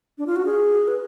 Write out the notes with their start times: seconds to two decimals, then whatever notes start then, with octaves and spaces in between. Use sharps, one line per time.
0.18 D4
0.27 F4
0.36 F#4
0.45 G#4
0.88 B4